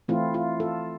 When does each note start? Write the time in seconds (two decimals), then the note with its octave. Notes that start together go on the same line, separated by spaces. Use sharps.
0.08 E3 A3 C4 E4 F4
0.34 F4
0.60 F4 A4